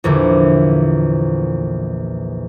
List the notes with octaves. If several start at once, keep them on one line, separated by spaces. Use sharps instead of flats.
A#1 E2 A#2 D3